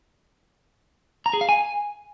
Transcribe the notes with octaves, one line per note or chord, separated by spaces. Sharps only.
A#5
G#4
F5
G#5